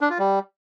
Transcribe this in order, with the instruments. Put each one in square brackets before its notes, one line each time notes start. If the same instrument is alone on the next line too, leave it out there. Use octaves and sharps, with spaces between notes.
[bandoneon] D4
F4
G3